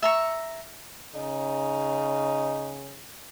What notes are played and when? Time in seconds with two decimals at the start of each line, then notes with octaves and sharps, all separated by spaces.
0.02 E5 A#5 C#6
1.15 C#3 D#4